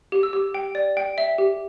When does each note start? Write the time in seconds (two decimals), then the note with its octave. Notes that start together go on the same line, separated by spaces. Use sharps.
0.12 G4
0.23 E6
0.33 G4
0.54 G5
0.75 D5
0.97 G5
1.18 E5
1.38 G4